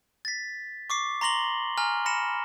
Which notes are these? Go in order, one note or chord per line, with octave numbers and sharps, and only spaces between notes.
A6 B6
C#6 D6 C7
A#5 C6 A#6 F#7 G7
G#5 A#5 F6
B5 A#6 C#7 E7